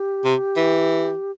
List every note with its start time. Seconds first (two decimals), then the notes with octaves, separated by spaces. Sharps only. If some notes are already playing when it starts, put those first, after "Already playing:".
Already playing: G4
0.25 C3
0.56 E3